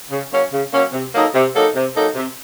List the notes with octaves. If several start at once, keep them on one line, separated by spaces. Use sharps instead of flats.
C#3
F#3 A#3 C#4
C#3
F#3 A#3 C#4
C3
F#3 A#3 D#4 A4
C3
F#3 A#3 D#4 A4
C3
F#3 A#3 D#4 A4
C3